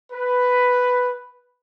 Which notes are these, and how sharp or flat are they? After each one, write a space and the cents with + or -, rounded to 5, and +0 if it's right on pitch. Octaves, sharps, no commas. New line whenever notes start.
B4 +5